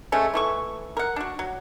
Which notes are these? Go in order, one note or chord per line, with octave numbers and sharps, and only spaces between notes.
G#3 A3 C#4
E3 A3 C#6
A#4 F#5
D4 F#4
F#3